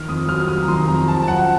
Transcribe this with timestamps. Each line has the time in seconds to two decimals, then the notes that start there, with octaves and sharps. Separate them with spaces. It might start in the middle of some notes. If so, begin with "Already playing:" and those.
Already playing: D#3 F6
0.09 F2 D#6
0.29 F#3 F6
0.40 F6
0.48 C3 D#6
0.63 A#5
0.68 D#3 C6
0.88 F2 A#5
1.07 F3 A5
1.23 A5
1.28 F#2 F#5